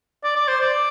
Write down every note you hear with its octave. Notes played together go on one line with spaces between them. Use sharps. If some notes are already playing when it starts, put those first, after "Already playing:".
D5
D5
C5
D5